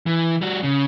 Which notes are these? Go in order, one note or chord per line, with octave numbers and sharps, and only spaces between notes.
E3
G3 F#4
C#3